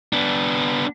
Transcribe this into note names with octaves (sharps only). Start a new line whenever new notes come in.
B3 D4